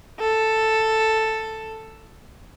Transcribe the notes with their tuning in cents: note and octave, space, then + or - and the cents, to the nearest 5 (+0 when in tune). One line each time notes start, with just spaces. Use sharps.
A4 +5